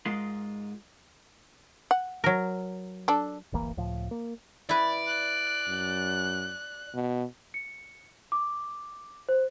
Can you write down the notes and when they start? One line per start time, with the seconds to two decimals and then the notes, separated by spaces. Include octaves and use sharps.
0.06 G#2 G#3 F4 A#4 C6
1.91 F#5
2.24 F#3 A#4
3.08 D4 A4
3.53 D1 G1 E3 A#3
3.77 C#2 A2 F3
4.11 A#3
4.69 E4 B4 D5
5.06 F#6
5.68 F#2
6.94 B2
7.54 C#7
8.32 D6
9.29 C5